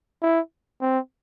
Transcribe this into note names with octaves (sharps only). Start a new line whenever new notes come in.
E4
C4